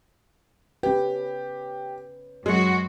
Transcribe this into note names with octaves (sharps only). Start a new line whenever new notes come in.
C#4 G4 B4
F#2 G#3 F#4